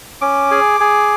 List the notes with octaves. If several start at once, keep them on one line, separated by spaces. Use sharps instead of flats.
C#4 D6
G#4
G#4